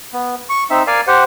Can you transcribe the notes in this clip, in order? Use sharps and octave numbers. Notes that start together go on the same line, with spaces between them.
B3
C#6
C4 D#4 E5
A#4 D5 F5 G#5
G4 C5 F#5